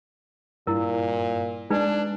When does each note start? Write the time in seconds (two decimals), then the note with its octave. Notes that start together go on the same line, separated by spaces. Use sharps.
0.67 G2 A#2 E4 A#4
1.70 G#3 D4 D#4 B4 G#5